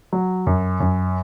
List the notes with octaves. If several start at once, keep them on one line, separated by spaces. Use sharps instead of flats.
F#3
F#2
F#2